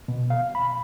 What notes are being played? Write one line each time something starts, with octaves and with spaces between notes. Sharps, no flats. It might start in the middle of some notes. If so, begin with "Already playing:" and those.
B2
F5
B5